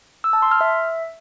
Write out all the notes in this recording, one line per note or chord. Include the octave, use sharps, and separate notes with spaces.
E6
A5
C6
F6
E5